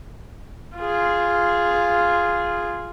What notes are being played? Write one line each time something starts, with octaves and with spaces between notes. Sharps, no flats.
F4 G#4